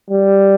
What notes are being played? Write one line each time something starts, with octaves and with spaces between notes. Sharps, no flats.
G3